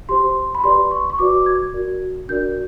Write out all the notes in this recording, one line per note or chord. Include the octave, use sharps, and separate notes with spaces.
G4 C5 C6
B5
G4 B4 D5 C6
C#6
C#6
F#4 B4 D5 D6
G#6
F#4 A#4 D5
D4 F#4 A#4 D5 G6